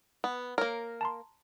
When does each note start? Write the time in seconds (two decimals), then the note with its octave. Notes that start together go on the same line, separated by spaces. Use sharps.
0.24 B3
0.58 A#3 A#4 C#5
1.01 A5 A#5 C6